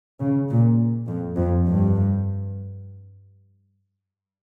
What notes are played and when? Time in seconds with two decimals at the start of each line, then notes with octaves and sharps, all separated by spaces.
0.21 C#3
0.50 A#2
1.08 F2
1.36 F2
1.66 G2